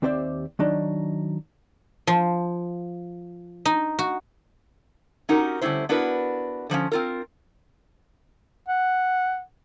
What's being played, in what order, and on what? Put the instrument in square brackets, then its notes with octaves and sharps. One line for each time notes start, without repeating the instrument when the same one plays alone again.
[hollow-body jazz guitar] D#2 C4 G4 C5 D5 E5
D#3 F#3 D4 D#4
[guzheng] F3
D#4
F#4
[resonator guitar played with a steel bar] C#4 D#4 F#4 G4 A#4
D3 G3 A3 C#4 E4 C5
B3 D4 E4 F#4 A#4 B4
D3 F3 B3 C#4
C4 F4 A#4
[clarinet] F#5